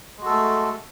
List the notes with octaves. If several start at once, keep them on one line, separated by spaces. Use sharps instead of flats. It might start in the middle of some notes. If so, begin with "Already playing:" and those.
G#3 A3 F#4 A4